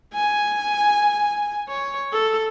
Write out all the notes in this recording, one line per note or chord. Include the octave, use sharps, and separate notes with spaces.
G#5
C#5
A4